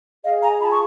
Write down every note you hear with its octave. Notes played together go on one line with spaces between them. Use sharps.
G#4 D#5 F5
G#5 A#5
F4 A5 B5
C#6